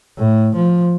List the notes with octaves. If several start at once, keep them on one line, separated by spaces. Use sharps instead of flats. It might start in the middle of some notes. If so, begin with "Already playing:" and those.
A2
F3